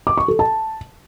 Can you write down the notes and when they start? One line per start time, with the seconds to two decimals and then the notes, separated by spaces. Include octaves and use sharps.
0.07 D6
0.18 C#6
0.28 A4
0.39 A5